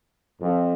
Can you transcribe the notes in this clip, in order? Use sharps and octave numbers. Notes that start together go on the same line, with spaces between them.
F2